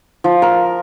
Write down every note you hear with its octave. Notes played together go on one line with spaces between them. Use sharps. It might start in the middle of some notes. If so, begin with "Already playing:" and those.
F3
A#4